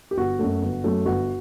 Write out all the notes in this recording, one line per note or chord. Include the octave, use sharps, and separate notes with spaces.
G4
G1 F#4
F#2 F#3 A3
G1
F#2 F#3 A3
G1 F#4